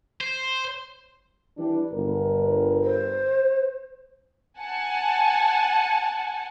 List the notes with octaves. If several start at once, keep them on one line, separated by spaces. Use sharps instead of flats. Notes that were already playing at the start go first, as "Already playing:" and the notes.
C5
E3 G3 D4
G1 A#4 B4
C5
F#5 G#5 A5